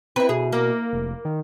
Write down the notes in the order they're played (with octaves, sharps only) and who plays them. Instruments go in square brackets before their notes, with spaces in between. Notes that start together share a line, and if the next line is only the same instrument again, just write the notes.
[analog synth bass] C4 [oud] E4 B4
[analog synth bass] B2 [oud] G#4
[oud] A#3
[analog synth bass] F1
D#3